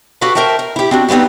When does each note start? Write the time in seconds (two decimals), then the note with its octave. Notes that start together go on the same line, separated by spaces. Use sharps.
0.21 F#4 G4 A4 B4 F5
0.35 A#4 C5 E5 G5 A5
0.59 A#4
0.76 E4 G4
0.91 C4 D4 F#4
1.09 G3 A3 B3 C4 D#4